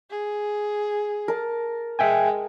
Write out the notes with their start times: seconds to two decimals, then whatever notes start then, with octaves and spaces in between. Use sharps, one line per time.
0.10 G#4
1.28 A#4 A5
1.99 G#3 E5 G5 G#5